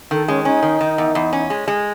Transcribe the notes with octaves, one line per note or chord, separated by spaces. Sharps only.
D#3 A4
G#3 C#4
C#4 D#4
D#3
D#3
E2
E2
C#4
G#3
G#3